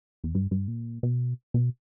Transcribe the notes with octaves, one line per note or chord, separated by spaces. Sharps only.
E2
G2
G2
A#2
B2
B2